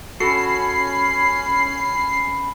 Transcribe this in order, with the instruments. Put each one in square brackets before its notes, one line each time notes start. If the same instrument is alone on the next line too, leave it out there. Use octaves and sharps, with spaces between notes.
[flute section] C#4 B5 [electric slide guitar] F#4 A4 [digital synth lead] C7